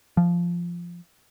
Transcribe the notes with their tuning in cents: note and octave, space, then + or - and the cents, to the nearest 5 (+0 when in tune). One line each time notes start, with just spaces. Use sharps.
F3 -10